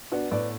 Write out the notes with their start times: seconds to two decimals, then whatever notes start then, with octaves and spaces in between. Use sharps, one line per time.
0.12 B3 D4 F#4
0.31 A2 B4 D5